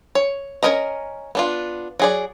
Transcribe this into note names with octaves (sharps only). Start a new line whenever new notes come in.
C#5
C#4 A4 A#4 D#5 A#5
B3 D4 F4
F#3 G#4 D5